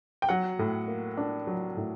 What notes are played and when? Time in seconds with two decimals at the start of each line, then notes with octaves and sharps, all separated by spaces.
0.22 G5
0.29 F#3 F#5
0.59 A2
0.88 A#3
1.17 D4
1.47 F#3
1.77 A2